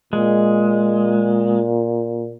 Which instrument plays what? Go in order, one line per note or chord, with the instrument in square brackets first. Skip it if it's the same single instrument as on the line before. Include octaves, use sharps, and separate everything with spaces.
[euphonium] A#2 [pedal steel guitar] G#3